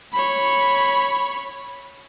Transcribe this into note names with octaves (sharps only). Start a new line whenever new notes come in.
C#5 B5